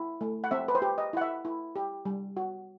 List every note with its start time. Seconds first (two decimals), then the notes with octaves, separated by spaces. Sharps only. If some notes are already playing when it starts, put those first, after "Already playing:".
Already playing: E4
0.21 A3
0.44 F#5
0.51 C4 E5
0.68 B4
0.75 C5
0.82 G4
0.98 D#5
1.13 E4 F#5
1.21 E5
1.45 E4
1.76 G4
2.05 G3
2.37 F#4